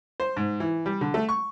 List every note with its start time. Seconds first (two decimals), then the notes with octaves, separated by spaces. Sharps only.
0.20 C5
0.37 G#2
0.60 E3
0.86 G3
1.01 D3
1.14 A3
1.29 C#6